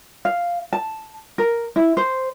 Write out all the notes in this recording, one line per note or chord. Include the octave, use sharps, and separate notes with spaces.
F5
A5
A#4
E4
C5